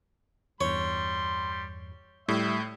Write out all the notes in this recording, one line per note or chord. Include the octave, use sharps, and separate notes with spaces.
E2 G2 G3 C#5 C6
A2 G3 E5